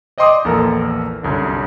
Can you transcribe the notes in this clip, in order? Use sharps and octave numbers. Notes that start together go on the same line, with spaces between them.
D5 D#5 G5 C6 D6 D#6
A#1 E2 A#3 A4 A#4
C2 F#2 D3